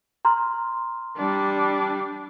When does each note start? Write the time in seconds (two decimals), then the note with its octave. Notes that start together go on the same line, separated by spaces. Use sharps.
0.25 A#5 C6 F6
1.18 G3 D4